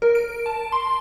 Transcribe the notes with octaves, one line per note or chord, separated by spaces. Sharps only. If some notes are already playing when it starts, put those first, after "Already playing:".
A#4
D7
A5
C6